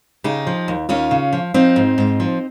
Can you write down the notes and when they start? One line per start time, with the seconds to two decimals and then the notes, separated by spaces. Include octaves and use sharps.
0.24 C#3 D#4 G4
0.47 F3
0.68 D#2
0.89 D#2 C#4 F4
1.11 C#3
1.33 F3
1.54 F3 C4 D#4
1.76 G#2
1.98 G#2
2.20 F3